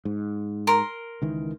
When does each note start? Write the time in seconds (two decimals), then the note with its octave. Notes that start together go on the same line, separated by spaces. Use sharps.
0.05 G#2
0.67 A#4 C6
1.22 C#2 D#3 E3